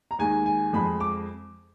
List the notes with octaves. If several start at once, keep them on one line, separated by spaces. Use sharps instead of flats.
A#5
D#2 D#3 G#3 G#5
G#5
F2 F3 G#3 B5
D6